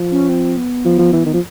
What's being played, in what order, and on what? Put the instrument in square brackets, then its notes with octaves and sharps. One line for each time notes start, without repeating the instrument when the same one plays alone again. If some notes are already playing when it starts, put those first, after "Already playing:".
Already playing: [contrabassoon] F3
[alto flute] C#4
C4
B3
[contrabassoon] F3
F3
E3
D#3
F3